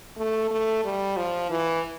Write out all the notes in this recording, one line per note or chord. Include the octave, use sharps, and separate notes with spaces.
A3
A3
G3
F3
E3